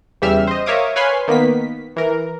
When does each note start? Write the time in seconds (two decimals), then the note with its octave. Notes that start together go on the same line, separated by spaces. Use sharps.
0.22 E2 C#3 G3 E5 F6 E7
0.47 C5 D#5
0.66 A#4 C#5 E5 F5 D6 D#6
0.96 B4 C#5 F5 G#5 B5 C6
1.28 D#3 A#3 B3 B6
1.96 E3 A#4